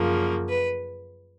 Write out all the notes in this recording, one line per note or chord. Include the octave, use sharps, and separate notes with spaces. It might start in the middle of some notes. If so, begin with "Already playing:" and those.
Already playing: F#2 C#3 F3 A#3
B4